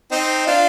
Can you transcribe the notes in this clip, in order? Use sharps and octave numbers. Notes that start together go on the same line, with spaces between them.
C4 D#4
D4 F4